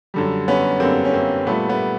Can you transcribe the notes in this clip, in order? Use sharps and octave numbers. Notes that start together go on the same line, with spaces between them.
F#2 D3 G3
B3 C#4
F#2 D3 G3 A#3 C4
C#4
A#3 C4
A#2 G3 A3 B3
A3 B3